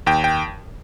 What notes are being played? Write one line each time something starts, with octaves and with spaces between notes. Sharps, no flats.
D#2 G5
G5